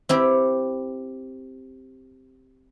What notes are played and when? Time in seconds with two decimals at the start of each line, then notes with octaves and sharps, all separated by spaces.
0.09 C4 E4 G4